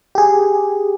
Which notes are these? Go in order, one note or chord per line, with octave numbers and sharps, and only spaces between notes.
G4 G#4